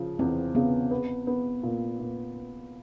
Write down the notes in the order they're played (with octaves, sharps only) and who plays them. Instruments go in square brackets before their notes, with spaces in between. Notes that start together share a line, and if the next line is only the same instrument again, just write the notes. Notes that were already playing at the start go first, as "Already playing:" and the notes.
Already playing: [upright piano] C#3 F3
[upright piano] E2 [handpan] C4
[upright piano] C#3 [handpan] B3
[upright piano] B3
B3
A#2
A#2